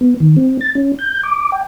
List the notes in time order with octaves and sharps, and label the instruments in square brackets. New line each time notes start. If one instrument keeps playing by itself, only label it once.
[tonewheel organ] B3
D#3
C4
A6
C#4
G6
D6
G5